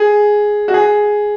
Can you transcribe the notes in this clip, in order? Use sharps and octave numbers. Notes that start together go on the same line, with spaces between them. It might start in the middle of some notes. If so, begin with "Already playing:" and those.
Already playing: G#4
F#4
G#4